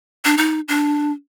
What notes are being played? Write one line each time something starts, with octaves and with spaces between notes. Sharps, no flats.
D4
D#4
D4